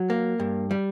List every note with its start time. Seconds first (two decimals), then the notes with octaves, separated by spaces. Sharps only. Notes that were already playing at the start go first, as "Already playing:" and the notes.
Already playing: F#3
0.10 A#3
0.40 G2
0.71 G3